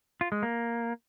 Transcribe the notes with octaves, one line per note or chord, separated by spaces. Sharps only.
F4
G#3
A#3